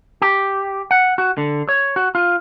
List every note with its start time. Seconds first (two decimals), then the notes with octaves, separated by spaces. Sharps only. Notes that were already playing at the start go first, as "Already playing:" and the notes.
0.22 G4
0.91 F#5
1.18 F#4
1.38 D3
1.69 C#5
1.96 F#4
2.15 F4